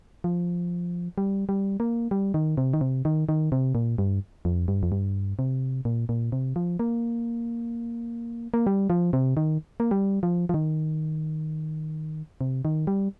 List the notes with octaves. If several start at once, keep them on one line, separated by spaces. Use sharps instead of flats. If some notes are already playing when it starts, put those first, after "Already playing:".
F3
G3
G3
A#3
G3
D#3
C3
D#3
C3
D#3
D#3
C3
A#2
G2
F2
G2
F2
G2
C3
A#2
A#2
C3
F3
A#3
A#3
G3
F3
C3
D#3
A#3
G3
F3
F3
D#3
C3
D#3
G3